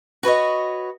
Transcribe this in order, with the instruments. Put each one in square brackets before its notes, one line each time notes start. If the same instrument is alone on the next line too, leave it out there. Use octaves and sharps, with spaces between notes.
[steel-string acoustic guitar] F#4 B4 C#5 D#5